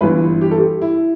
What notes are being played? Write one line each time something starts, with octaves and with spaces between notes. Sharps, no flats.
G1 G2 E3 B4
G4
A4
G4
E4